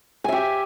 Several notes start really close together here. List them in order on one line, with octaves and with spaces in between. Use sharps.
G#5 E5 G4